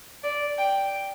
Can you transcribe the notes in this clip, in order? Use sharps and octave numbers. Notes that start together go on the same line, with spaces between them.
D5
G5